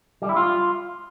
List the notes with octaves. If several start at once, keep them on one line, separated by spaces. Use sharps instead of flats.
G3
E4
F4